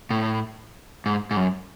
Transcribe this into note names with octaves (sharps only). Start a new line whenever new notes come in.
A2
G#2
G#2
F#2